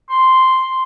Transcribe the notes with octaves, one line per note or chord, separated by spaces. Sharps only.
C6